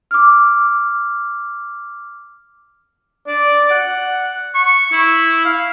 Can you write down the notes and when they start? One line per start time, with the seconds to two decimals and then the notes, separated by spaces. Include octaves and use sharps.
0.11 D6 F6
3.27 D5
3.71 F#5
4.55 C#6
4.92 E4
5.45 F5